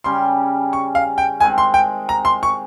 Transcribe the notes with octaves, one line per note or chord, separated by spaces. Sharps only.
C#3 G3 C#4 C6
C#6
F5
G5
D#3 G#3 C4 G#5
C6
G5
A#5
C6
C#6